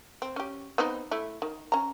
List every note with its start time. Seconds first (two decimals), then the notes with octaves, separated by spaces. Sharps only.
0.22 C4
0.36 C#4 G4
0.78 B3 C4 D#4
1.11 A3 E4
1.42 D#3
1.72 C#4 A#5